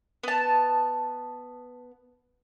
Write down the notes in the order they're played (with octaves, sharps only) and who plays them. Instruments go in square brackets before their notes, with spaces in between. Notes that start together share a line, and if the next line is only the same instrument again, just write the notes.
[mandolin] B3 A5